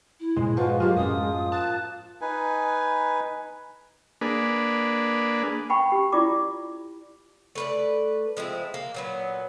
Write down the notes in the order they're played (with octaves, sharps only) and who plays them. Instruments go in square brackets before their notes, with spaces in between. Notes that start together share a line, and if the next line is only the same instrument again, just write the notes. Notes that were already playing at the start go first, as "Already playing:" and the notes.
[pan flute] E4
[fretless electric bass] G2 A#2 [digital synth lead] G#3 [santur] C5
[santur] F3 F#4 [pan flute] B4
[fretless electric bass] F#3 [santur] A#3 F4 [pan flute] G4
[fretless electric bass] F#2 A2 C#4 [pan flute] D#6
[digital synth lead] A5 [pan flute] F#6
[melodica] D#4 B4 G#5
[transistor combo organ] A#3 D4 G#4 B4
[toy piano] F#5 G5 B5 C#6
G4
E4 F4 D5 D6
[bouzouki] A3 B4 D5
F3 G#3 C4 E4
A#3
A#2 F#3 B3